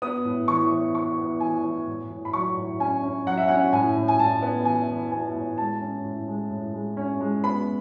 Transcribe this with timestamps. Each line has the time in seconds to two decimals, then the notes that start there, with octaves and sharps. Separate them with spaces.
0.02 B3 D#6
0.25 A2
0.48 E3 C#6
0.72 B3
0.95 B3 C#6
1.18 B3
1.40 E3 G#5
1.64 E3
1.87 A2
2.10 A2
2.25 B5
2.33 F#3 C#6
2.57 A2
2.80 C#4 G#5
3.03 C#4
3.27 F#3 F#5
3.37 E5
3.48 C#4 F#5
3.72 A2 G#5
3.96 A2
4.08 G#5
4.20 A2 A5
4.42 B3
4.65 E3 G#5
4.89 E3
5.12 B3 G#5
5.35 A2
5.58 G#3 A5
5.81 C#4
6.04 A2
6.28 G#3
6.50 A2
6.74 G#3
6.97 C#4
7.21 G#3
7.44 B3 B5